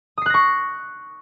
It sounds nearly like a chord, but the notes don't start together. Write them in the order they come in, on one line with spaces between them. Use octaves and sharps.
D#6 C7 F#6 A#6 C#6